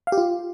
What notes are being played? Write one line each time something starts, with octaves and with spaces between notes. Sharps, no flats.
F5
G4
F4